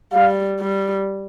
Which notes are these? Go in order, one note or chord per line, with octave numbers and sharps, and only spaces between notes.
G3 F5
G3